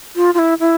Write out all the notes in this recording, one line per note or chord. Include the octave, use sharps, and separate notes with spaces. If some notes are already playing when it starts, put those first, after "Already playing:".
F4
F4
E4
E4